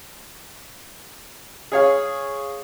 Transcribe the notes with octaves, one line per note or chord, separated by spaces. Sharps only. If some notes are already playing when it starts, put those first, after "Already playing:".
G#4 C#5 F5